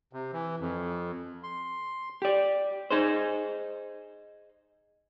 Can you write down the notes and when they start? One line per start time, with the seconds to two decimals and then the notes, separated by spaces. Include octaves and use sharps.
0.13 C3
0.33 E3
0.60 F2
1.43 C6
2.22 G4 D5
2.91 D#4 G#4 C5